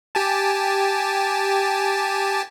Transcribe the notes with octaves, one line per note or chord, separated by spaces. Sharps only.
G4 G#5 A5